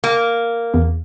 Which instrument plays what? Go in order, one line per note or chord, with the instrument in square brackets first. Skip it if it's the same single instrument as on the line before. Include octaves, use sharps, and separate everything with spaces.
[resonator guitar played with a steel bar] A#3
[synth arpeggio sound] E2